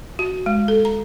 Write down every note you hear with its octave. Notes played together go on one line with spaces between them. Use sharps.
F#4
G#3
A4
A#5